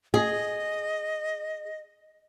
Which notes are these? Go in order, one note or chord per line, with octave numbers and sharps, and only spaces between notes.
G#4 D#5